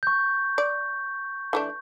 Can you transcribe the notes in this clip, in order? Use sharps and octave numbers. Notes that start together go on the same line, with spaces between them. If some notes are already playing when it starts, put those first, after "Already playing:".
C#6 G6
D5
E3 A3 D4